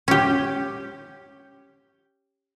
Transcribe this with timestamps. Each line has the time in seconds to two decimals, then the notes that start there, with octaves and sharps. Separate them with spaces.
0.08 C#4 G4